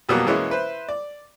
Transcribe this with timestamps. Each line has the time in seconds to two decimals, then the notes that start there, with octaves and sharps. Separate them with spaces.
0.09 F2 B2 F#3 G3 A#3 B3
0.26 B2 E3 G#3 A#3 B3 C#4
0.50 E4 B4 C5
0.89 D5